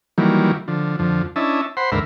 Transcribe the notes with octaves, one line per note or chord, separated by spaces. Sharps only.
D#3 E3 F#3 G3 A#3
D3 F3
F2 D3 F3
C#4 D4 E4 D#5 E5 A5
C5 F#5 B5 C6
D#2 G#2 D3 A#4 E5 B5